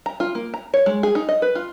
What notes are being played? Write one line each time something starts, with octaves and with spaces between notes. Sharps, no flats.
A#5
F4
A#3
A#5
C#5
G#3
G#4
D#4
D#5
B4
F4